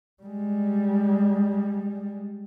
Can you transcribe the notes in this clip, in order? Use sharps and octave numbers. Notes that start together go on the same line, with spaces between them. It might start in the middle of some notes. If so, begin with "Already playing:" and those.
G3 G#3